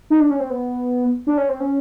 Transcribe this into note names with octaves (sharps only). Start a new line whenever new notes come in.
D#4
D4
C#4
C4
B3
D4
C#4
C4
C#4